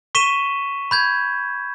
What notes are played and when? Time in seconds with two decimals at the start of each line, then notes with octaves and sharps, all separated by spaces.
0.15 C#6 B6 D#7 E7 G7
0.91 B5 G6 G#6